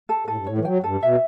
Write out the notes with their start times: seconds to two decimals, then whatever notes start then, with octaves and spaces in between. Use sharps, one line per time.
0.09 A4
0.27 A2 A4
0.37 G2
0.47 A2 C#5
0.58 E3
0.65 F#3 G5
0.83 G2 A4
1.03 B2 E5